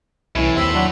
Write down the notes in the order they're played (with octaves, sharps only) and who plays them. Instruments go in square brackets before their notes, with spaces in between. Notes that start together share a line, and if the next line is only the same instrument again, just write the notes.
[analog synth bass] C2 [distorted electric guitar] A2 [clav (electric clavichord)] E3 C#4 E4
[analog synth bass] D#2 [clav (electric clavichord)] C4 [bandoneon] B5 C6 E6
[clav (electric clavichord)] F#3 D4 F#4